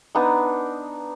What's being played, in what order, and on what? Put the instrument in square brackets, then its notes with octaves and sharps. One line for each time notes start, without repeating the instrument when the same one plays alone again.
[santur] B3 D4 D#4